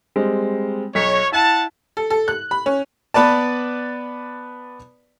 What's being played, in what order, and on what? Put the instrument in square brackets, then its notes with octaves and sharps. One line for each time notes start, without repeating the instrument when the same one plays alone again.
[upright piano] G3 G#3 C4
[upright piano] B1 B6 [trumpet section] C#5
[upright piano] E4 [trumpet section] F#5 A5
[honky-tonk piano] A4
A4
F#6
B5
C#4
[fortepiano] B3 B4 D5 A5